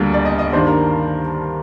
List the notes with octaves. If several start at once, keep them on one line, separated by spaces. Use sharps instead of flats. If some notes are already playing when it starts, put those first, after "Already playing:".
Already playing: D2 D3 G3 A#3
D5
D#5
D#5
G2 D#3 A#3 D4 C5
A#4